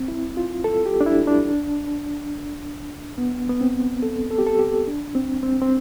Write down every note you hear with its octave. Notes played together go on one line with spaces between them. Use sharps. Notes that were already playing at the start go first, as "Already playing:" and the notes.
Already playing: C4
E4
F4
A4
G4
D4
E4
D4
B3
B3
C4
A4
A4
G4
A4
G4
D4
C4
C4
C4